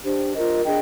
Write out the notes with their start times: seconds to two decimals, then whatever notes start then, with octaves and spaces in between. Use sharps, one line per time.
0.03 D4 G4 C5
0.34 F4 A#4 D#5
0.65 D4 G#4 D#5 G5